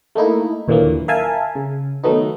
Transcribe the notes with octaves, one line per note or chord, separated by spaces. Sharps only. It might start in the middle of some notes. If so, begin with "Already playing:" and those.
A3 A#3 D#4 E4
D#2 A#2 D3 E3 F#3 A#3
A#4 E5 F5 G#5 A5
C#3
D#3 F#3 A3 B3 D#4